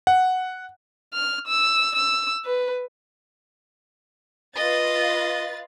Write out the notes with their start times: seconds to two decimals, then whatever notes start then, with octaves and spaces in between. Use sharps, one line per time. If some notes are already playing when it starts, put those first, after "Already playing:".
0.07 F#5
1.13 F6
1.47 E6
1.96 E6
2.45 B4
4.56 F4 B4 D#5 A6